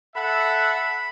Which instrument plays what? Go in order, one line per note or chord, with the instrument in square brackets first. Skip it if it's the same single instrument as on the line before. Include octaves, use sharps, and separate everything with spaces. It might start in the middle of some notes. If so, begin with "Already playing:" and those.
[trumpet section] A4 E5 F#5 [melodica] B5